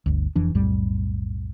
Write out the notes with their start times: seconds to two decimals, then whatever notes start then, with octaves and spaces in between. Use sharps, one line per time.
0.06 G1 D2
0.36 F1 F2 E3 D4
0.55 B1 F2 A2 G3